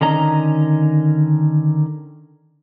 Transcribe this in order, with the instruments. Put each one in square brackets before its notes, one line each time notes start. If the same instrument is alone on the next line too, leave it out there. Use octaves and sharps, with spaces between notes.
[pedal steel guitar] D3 D#3 C#4 D#5 A#5